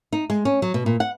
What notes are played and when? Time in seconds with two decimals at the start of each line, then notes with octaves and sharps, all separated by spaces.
0.13 D#4
0.30 G#3
0.45 C#4
0.62 F#3
0.74 B2
0.86 A#2
1.00 F#5